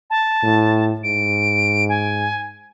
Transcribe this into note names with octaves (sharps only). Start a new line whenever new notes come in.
A5
A2
G#2 D7
G#5